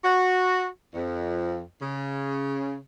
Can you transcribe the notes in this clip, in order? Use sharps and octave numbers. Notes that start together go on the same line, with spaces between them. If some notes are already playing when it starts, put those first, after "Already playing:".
F#4
F2
C#3